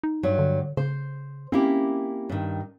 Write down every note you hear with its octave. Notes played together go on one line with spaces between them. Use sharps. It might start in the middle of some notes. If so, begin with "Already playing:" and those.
D#4
G2 F#3
D3
C#3 C5
A#3 C4 C#4 E4 G4
G2 D#3